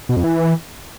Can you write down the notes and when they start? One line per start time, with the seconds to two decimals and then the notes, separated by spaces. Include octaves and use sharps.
0.09 B2
0.17 F2
0.24 E3